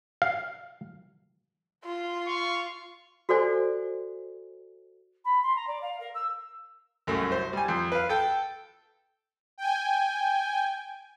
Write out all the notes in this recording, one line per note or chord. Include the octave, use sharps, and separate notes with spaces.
F5
F4
F5 C#6
F#4 A4 C5 D5 G#5
B5
C6
A#5
D5
F5
A#4
E6
C2 F#2 A3
C5
G3 G#5
F2
B4 F5
A4 G5
G5 G#5